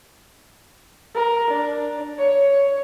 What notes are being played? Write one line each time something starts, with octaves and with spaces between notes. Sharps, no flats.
A#4
D4
C#5